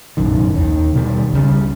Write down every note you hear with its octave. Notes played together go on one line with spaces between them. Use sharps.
F1 A#1 F#2 D#3
D#2 D#3
B2 D#3 F#3 G3
C#2 C#3 G3